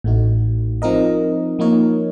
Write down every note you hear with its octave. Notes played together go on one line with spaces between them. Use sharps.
A1 A2 A3 D#4 F#4
F3 C4 D#4 A#4 D#5
F3 A#3 D#4 A#4 C#5